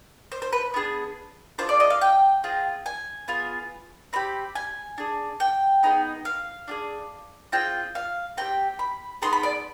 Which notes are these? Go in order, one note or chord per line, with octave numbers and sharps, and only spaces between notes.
C5
C5
B4
B3 D4 F4 G#4
D4 F4 G#4 C5
D5
D#5
F5
G5
C4 F4 G#4
G#5
B3 F4 G#4
C4 G4 B5
G#5
D4 G#4
G5
B3 D#4 G#4
F5
D4 F4 G#4
C4 F4 G#4 G5
F5
C4 D#4 G4 G5
B5
B3 D#4 G#4 C6
B5
D5